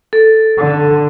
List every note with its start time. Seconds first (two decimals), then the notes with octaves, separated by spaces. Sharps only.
0.13 A4
0.58 D3